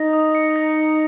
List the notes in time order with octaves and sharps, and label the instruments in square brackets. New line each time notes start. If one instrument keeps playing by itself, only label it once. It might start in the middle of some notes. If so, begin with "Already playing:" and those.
Already playing: [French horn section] D#4 [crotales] A#6
[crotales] D#6
C#7
A#6